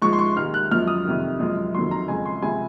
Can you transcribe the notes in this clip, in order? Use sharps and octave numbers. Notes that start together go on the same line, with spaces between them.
G#2 F3 G#3 C#6
C6
C#6
D#2 D#3 G#3 F6
F#6
F#2 F3 G#3 F6
D#6
F2 C3 D#3
F#2 F3 G#3
F2 D#3 F#3 C6
A#5
F2 C#3 G#3 G#5
C6
C#2 C3 F3 G#5